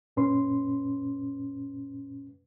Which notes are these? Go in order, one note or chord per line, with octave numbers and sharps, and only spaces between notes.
F#2 A#2 C#4 B4 C6